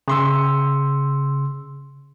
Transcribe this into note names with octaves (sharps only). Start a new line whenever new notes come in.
C#3 C6 E6